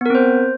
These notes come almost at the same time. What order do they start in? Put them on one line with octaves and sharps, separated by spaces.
B3 A#4 C4 C5